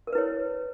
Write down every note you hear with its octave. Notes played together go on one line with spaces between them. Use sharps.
E4 A#4 B4 C#5 D5